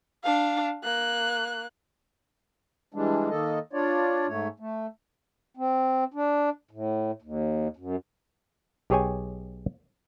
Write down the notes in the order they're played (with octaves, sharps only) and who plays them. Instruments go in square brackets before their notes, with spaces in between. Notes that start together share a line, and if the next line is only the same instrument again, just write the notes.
[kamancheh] D4 F5
A#3 F#6
[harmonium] E3 G3 G#3 D4
D#3 A#3 A4 D#5
D4 F4 C#5 D5
G#2 A3 C#5
A3
C4
D4
A2
D#2
F#2
[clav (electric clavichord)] B1 G4 G#4 C#5 G5 G#5